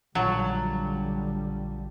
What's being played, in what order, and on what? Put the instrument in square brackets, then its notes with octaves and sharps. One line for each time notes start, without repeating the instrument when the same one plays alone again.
[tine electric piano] A#1 F4 A5 [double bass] D3 G3 [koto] F#3